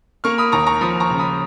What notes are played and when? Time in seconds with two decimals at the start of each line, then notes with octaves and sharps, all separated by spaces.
0.24 A#3 C#6 F6
0.38 B5 D#6
0.52 D#2 A#5 C#6
0.67 A#5 C#6
0.81 F3 B5 D#6
1.00 A#5 C#6
1.10 C#3
1.19 B5 D#6